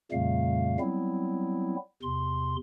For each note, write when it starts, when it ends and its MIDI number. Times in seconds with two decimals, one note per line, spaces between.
0.12 0.77 41
0.12 0.77 46
0.12 0.77 49
0.12 0.77 55
0.12 0.77 57
0.12 0.77 77
0.80 1.76 54
0.80 1.76 55
0.80 1.76 59
0.80 1.76 60
0.80 1.76 64
2.03 2.56 40
2.03 2.56 48
2.03 2.56 84